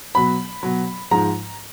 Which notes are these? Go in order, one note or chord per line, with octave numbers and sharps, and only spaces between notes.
B2 F#3 B5
B2 F#3
G#2 F3 G#3 A#5